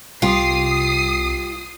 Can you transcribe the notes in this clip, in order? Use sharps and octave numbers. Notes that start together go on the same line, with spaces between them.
C2 F4 G4 D#6 C7